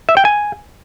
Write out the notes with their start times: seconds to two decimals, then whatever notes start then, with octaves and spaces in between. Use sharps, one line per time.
0.09 E5
0.17 G5
0.25 G#5